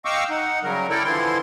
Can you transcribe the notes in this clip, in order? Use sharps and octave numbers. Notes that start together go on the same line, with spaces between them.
D#5 F5 G5 C#6 D6 E6
D#4 F#5
C#3 F#3 G3 A#4
E4 A4 A#4 D5 G5
D3 E3 F3 E4 C6